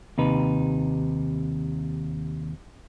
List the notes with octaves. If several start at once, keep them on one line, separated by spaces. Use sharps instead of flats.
D#2 C3 D#4 B4